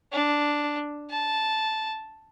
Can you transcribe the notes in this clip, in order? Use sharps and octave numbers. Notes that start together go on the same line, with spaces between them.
D4
A5